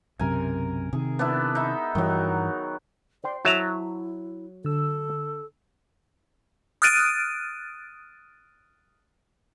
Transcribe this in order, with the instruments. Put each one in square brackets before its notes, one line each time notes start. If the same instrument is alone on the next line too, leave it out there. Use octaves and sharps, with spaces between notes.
[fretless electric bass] B1 F#2 C3 [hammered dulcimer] A#4 G#5
[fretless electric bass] C3 D#3 [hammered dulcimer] G#4
[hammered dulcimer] B3 D4 E4
D#4 E5
[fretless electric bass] G2 E3 G3 [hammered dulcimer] D#3 F#3
[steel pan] C5 G5 C6 [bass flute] D5
[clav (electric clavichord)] F#3 A5 A#5 [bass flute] E4 [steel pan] F#4 C#5 E5
[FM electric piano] D3 E6 [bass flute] A4
[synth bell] D#6 F6 F#6 A6 D7 D#7